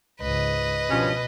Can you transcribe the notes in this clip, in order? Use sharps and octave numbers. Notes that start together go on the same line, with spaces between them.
C#2 G#2 B4 D#5
G2 B2 F3 C#4